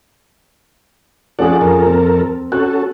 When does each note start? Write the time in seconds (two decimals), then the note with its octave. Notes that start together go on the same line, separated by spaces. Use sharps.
1.39 F3 C#4 G#4 A4 D5 F#5
1.61 F2 A4 A#4
1.85 C4
2.52 C#4 F#4 A4 F#6